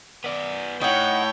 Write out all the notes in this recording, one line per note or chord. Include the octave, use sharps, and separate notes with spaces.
B3 D5
A2 D#4 C#5 F#5 G5